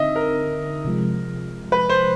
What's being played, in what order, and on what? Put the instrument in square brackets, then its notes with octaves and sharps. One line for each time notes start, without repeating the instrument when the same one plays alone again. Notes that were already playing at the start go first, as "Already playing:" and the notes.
Already playing: [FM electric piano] D3 C4 D#4 [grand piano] D#5 E5
[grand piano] A#4
[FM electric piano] C3 F3 G#3
[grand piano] B4
C5